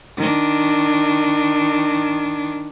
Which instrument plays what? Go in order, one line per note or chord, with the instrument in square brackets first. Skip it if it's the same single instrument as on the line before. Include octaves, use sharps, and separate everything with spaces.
[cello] D#3 D4